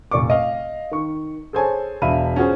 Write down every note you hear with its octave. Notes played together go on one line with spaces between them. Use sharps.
F1 A#2 D5 C#6 D6
D#5 F5
D#3 C#6
G#4 A4 C5 C#5 G#5 A5
E1 D4 E5 F5 B5 D#7
C#4 F4 F#4 G#4 C5